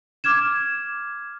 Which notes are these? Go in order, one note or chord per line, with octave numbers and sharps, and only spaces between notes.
D6 F6 G#6 E7